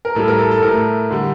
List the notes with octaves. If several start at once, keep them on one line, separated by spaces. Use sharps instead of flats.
A#4
A2 G3 A4
A#4
A4
A4
A2 A3 A#4
D3 G3